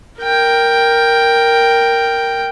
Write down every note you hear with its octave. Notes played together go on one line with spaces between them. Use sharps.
A#4 G5